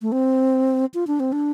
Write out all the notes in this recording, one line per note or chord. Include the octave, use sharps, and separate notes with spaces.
A3
C4
F4
D4
C4
D4